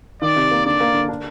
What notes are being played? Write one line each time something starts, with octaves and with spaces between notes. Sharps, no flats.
D#3 D5
C3
A#3
D3 D5
A#3
D3
D4